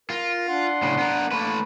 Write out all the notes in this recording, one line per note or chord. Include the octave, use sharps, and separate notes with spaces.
F4 A#4
D4 F#5 C6
A2 C#3
B3 A#4
A3 A#3 B4